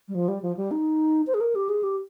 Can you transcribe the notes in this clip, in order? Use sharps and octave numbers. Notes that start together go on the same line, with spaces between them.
G3
F3
G3
F3
G3
D#4
C5
G#4
A#4
G4
G#4
G4